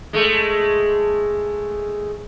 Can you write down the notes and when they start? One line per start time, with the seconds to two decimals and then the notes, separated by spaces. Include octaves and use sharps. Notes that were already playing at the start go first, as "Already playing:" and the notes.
0.13 G#3 A3